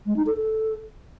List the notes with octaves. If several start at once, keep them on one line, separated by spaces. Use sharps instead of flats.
G#3
D#4
A4
A4